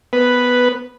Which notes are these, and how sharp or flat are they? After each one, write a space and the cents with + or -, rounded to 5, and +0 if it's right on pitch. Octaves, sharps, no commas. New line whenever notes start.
B3 +5 B4 +0